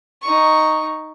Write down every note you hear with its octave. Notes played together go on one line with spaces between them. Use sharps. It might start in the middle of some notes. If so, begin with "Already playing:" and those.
D#4 C#6